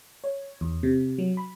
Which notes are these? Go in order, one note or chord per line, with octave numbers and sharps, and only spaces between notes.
C#5
E2
C3
F#3
B5